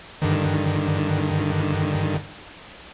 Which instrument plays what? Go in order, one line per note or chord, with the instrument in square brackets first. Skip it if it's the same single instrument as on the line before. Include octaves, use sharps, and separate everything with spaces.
[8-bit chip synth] G2 D3 D#3